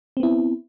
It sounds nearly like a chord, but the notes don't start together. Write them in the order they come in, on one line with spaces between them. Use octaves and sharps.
C4 B3 E4